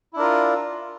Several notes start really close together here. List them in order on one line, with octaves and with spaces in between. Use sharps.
E4 D4 A#4 F4